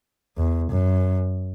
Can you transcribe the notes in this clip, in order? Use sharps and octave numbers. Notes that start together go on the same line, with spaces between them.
E2
F#2